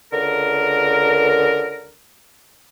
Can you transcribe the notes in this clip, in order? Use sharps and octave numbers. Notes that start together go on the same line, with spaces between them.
C#2 D3 A#4